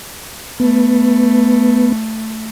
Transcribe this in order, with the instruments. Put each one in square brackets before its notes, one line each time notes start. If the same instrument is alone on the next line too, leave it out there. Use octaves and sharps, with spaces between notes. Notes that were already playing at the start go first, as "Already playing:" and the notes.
[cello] A3 [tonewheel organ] B3